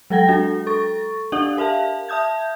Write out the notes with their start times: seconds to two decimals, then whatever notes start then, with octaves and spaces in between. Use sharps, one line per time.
0.10 F#3 G#3 A4 F#5 G5 A#6
0.28 G#3 D4 F#4
0.67 A4 C#6 A6
1.32 D4 G4 D5 F5 F#5
1.57 G4 A#4 E5 F5 A5
2.08 E5 A5 D#6 G6 G#6